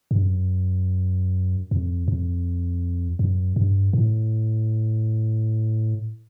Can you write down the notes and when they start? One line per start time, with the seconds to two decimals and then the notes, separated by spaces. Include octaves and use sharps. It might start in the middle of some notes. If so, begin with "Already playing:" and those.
0.11 G2
0.22 F#2
1.71 F2
2.08 F2
3.19 F#2
3.56 G2
3.93 A2